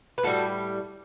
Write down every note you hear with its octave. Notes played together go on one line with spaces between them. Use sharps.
B4
A2 G3 F#4 A4